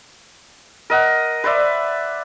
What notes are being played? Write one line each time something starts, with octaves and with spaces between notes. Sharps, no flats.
A#4 D#5 F#5
B4 C5 D5 E5